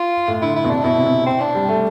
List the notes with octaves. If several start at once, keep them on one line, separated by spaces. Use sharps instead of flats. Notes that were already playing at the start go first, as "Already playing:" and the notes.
Already playing: F4
A2
D3 E4
E4
B2
C3 D4
B2 E4
C3
B2
C4
D4
G3
A3